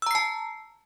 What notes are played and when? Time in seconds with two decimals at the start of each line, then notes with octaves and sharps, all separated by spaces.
0.02 E6
0.07 A#5
0.11 C7
0.15 A5